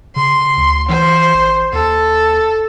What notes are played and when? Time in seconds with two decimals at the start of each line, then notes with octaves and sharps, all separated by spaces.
0.16 C#3 C6
0.57 D2
0.89 E3 C5
1.34 A1
1.73 D#2 A4